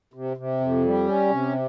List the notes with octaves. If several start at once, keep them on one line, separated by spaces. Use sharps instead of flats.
C3
C3
F2
G3
C#4
C3